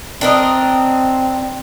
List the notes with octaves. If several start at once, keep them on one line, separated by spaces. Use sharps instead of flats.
C4 D4 A#4 D#5